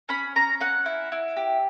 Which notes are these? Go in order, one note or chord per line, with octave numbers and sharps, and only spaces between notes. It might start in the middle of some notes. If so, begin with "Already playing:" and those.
C#4 B5
C#4 A#5
C#4 F#5
E4
E4
G4